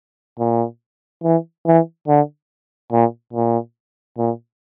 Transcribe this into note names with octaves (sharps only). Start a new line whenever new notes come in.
A#2
E3
E3
D3
A#2
A#2
A#2